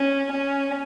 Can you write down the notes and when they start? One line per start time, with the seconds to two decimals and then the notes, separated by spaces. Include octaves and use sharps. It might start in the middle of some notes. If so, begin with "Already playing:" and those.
Already playing: C#4
0.32 C#4